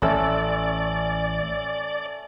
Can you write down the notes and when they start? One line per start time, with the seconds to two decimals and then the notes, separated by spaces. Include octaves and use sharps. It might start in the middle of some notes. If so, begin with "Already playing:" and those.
0.02 A1 A3 C#4 D5 E6